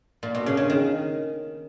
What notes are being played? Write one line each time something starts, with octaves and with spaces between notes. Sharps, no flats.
A#2
B2
C#3
C#3
D#3